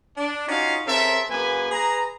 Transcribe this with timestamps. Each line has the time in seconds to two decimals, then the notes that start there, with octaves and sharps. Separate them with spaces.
0.17 D4
0.49 C#4 D#4 F4 F#4 F5
0.86 C#3 C4 A4 A#4 E5
1.30 F#2 A#3 G#4 B4 G#5
1.71 G#4 B4 A#5